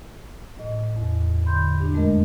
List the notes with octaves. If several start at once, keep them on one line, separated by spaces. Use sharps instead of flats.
A2 D#5
E2
D3 B5 C6 G6
D4 G4
F2 G#3 A3 A#4 D#5